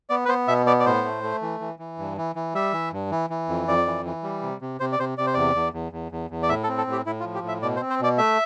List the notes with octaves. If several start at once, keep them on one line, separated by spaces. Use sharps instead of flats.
B3 D5
B4
B3 C5
B2 E5
B3 D5
D5
A2 C5
A3
A3
E3
E3
E3
G2
E3
E3
G3 E5
E3
G2
E3
E3
F2
F2 D5
E3
E3
G3
C3
C3
C3 C5
D5
C3 C5
C3 D5
C5
E2 D5
E2
E2
E2
E2
E2
D5
A2 E5
A4
C4
A4
A2
G4
A2 E4
F4
F3
G4
A2
E5
B2 D5
C5
C4
C5
B2 D5
A3 E5